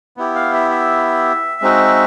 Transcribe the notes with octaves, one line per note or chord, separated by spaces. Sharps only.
B3 E4 G4
F5
E5
E5
G#3 C4 D#4 F#4